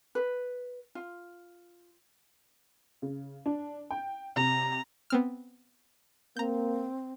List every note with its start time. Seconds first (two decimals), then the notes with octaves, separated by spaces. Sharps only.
0.15 B4
0.95 F4
3.02 C#3
3.46 D4
3.90 G5
4.36 C3 A#5
5.10 B3 C4 F6
6.37 A#3 C4 A#5 G6